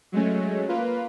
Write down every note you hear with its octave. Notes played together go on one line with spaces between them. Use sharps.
F#3 G#3 A3 C#4
A#3 F4 B4